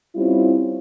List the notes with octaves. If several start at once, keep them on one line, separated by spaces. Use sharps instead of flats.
G3 C4 C#4 E4 F4